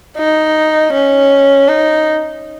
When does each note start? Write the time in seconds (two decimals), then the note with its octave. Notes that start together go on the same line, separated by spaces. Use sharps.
0.17 D#4
0.93 C#4
1.68 D#4